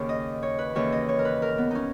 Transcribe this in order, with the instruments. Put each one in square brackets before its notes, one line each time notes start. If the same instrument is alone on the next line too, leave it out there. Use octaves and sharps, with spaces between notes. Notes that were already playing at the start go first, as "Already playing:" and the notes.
Already playing: [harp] D#2 C#3 C#5
D#5
C#5
B4
D#2 C#3 E3 C#5
D#5
C#5
A#4
B4
A#4
B3
C#4 D#4